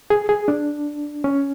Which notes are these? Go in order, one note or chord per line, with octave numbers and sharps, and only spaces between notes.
G#4
G#4
D4
C#4